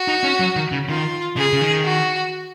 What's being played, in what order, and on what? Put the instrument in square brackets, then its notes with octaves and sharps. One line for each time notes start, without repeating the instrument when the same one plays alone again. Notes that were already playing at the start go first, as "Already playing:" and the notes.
Already playing: [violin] F#4
[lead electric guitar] D#4
C#4
F#3
D#3
C#3
[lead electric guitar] D#3 [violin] F4
[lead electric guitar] C#3 [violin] G#4
[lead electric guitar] C#3
D#3
[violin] F#4